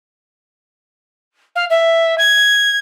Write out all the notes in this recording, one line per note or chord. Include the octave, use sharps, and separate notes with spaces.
F5
E5
G#6